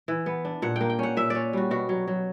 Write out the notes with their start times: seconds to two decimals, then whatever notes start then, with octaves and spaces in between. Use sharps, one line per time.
0.08 E3
0.26 B3
0.45 D4
0.62 A#2 F#5
0.76 A#3 G5
0.90 G5
0.99 C#4 F#5
1.17 A#2 E5
1.30 C#4 D5
1.53 G3 F#4
1.71 B2 F#4
1.89 F#3
2.07 F#3